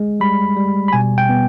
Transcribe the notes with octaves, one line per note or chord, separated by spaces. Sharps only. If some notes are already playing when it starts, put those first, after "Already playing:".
Already playing: G#3
G3 B5
G3
B5
B2 G#5
G5
B3